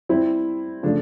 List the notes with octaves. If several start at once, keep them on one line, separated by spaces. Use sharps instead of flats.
G3 C4 E4
C#3 F3 A3 D4